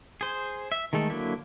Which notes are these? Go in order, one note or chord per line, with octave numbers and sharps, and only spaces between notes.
G#4 C5
E5
D#3 G#3 A3 A4
D3 F#3 A#3 E4